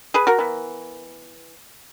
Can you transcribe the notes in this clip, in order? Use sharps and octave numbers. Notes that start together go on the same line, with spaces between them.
G#4 B4
F#4 A#4
E3 B3